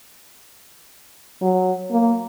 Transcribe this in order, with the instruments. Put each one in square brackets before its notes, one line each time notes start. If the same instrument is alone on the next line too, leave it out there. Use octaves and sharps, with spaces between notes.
[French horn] F#3
A#3